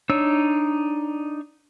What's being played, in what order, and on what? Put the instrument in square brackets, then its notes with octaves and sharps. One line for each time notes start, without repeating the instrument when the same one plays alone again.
[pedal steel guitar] D4 D#4 C#5 E6